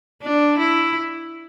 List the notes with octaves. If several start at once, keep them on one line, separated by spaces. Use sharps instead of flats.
D4
E4